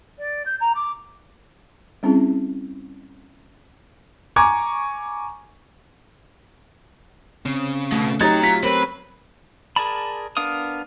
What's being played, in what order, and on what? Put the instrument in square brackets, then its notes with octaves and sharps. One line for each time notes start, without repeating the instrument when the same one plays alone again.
[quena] D5
G6
A#5
D6
[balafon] G3 C4 C#4 E4 G#4
[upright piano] G#5 A#5 C#6 D6 G#6
[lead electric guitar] C#3 [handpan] C4
[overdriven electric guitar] B2 [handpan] A3
[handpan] F#3 G4 C#5 [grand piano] D#4 A6 [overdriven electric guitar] F#4 A#5
[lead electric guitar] F4 [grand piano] B6
[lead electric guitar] C4 [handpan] A#4 C#5 [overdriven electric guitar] B4 B5
[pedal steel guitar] G#4 A#4 D5 A5 B5
B3 D4 A#4 F5 D#6